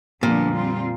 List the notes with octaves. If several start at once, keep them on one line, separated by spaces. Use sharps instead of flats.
F2 A#2 D3 G3 B3 D4
G3 C4 F4